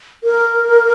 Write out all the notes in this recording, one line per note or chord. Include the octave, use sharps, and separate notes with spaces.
A#4